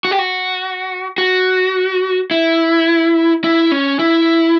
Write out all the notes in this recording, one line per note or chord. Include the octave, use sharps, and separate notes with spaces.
F#4
G4
F#4
F#4
E4
E4
C#4
E4